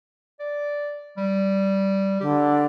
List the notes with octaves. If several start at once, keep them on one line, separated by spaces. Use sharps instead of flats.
D5
G3
D3 G4